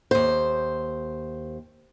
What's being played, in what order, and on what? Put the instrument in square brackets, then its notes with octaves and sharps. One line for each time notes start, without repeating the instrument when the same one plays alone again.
[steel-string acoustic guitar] D#2 C5